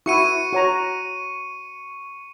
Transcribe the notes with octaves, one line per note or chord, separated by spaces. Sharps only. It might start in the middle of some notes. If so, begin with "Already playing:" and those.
E4 F#4 C#6 C#7 D#7
F#4 C#5 A#5